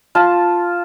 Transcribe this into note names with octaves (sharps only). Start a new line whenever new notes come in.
F4 A5